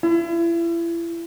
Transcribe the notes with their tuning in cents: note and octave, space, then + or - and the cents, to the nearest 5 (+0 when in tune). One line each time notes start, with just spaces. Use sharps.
E4 +35